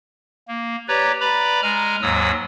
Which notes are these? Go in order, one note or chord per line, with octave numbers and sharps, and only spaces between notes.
A#3
G4 B4 C#5 D5 A#5
B4 D5 A#5 B5 D6
G#3 G#5 A#5 F6
D#2 G#2 F#3 D#6 E6